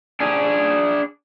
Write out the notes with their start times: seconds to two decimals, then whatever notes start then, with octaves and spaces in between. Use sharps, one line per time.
0.20 D4 G#4